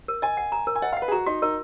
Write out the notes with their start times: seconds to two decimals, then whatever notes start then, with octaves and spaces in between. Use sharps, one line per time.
0.08 A#4
0.22 D#5 G#5
0.37 F#5
0.52 A#5
0.67 A#4
0.75 G#5
0.82 D#5 F#5
0.93 F5
0.97 F#5
1.02 B4
1.08 G#4
1.12 F#4 A#5
1.26 D#4 F#4
1.42 D#4 A#4